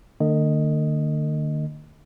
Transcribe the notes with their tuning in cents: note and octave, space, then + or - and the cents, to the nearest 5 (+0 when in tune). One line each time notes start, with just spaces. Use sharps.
D3 +45 A#3 -45 D#5 +0